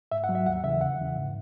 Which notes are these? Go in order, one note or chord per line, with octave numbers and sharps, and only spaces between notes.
G#2 E5
F#5
F#3
E5
D#2 F#5
C#3 E3 E5
E2 F#5
C#3 E3
G#2